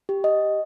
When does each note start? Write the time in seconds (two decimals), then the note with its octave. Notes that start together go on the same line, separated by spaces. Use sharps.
0.09 G4
0.24 D#5